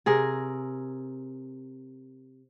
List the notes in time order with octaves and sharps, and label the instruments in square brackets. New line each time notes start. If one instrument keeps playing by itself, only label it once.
[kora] C3 G#4 A#4